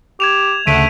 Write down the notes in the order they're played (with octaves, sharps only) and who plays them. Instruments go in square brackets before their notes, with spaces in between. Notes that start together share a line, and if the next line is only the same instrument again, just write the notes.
[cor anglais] G4 [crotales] G#6 E7 F7
[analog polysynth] D2 C#3 F#5 [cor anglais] A3 [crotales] B6 D7 D#7